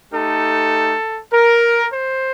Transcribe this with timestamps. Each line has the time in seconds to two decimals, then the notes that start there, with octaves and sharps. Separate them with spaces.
0.13 A3 D#4 G4 A4
1.33 A#4
1.92 C5